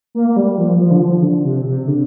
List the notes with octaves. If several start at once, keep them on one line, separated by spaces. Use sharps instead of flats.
A#3
A#3
G3
F3
F3
D3
F3
D3
C3
C3
D3